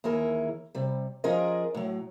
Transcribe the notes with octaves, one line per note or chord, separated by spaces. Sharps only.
D#2 E3 E4 G#4 A#4
C3 G3
F3 C#4 F4 G#4 A#4 D#5
A2 F#3